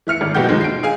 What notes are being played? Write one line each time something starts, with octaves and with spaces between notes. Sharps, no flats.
E3 E5 F6 C#7
G#1
F#1 B2 E3 F#4 G4 G6
D#2 D#3 F3 G#3
C7 D7
G#4 F5 G#5